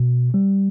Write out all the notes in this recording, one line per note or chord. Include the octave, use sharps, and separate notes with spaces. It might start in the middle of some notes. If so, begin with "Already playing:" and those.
Already playing: B2
G3